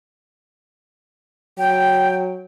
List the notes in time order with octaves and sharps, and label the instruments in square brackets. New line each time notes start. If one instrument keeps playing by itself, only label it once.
[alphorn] F#3 [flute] G5